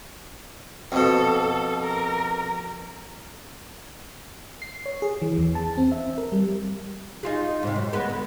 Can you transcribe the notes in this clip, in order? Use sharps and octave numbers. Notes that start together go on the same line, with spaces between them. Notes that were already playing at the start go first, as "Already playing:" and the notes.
F2 B2 A4
A#4
C7
C#5
G#4
E3
E2
A5
C4
E5
A#4
G3
D#4 F4 G#4
G#2 C3
F#2
G#3 B3 B4
D3